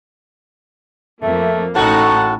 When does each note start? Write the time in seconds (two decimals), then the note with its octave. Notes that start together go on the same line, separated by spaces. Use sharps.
1.22 F2 A3 A#3 E5
1.75 A1 A2 D#4 F#4 A4 F#5 A5